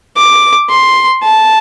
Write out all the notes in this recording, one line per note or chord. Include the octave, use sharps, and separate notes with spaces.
D6
C6
A5